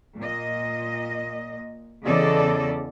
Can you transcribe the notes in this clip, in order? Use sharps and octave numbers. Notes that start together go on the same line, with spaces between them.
A#2 D#5
E2 C#3 A4 D5 D#5